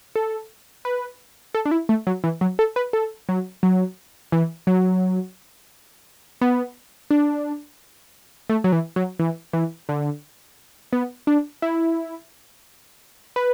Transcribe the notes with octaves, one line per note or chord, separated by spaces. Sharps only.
A4
B4
A4
D4
E4
A3
F#3
E3
F#3
A4
B4
A4
F#3
F#3
E3
F#3
B3
D4
A3
F#3
E3
F#3
E3
E3
D3
B3
D4
E4
B4